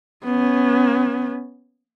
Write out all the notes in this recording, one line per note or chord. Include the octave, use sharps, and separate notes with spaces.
B3 C#4